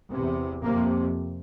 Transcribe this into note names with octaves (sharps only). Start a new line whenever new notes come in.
E2 C3
F2 C3 A#3